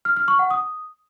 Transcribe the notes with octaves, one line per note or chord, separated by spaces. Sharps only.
F6
F6
C#6
F#5
D#6